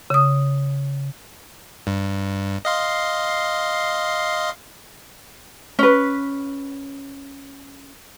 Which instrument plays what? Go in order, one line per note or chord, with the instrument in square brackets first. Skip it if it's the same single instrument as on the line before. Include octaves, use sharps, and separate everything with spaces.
[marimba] C#3 D#6
[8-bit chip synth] G2
D#5 F5 C6
[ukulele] C#4 B4